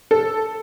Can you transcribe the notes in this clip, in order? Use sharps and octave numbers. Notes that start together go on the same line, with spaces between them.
A4